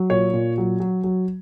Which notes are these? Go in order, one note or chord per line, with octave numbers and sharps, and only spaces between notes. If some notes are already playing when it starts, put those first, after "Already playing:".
Already playing: F#3
A#2 C#5
A#2
F#3
F#3
F#3